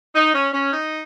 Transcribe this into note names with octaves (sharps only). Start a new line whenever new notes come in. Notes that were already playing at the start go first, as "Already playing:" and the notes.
D#4
C#4
C#4
D#4